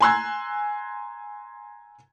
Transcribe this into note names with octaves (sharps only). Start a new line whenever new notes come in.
G#5 A#5 C6 E6 F#6 G#6